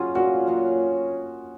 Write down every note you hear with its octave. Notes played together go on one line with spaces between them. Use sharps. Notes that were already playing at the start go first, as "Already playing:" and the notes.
Already playing: F#3 C#4 F4 F#4 G#4
A#2 F#4
F#3 C#4 G#4